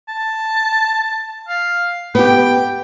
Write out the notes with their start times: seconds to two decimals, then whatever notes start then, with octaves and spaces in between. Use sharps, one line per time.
0.08 A5
1.48 F5
2.15 B3 G4 G5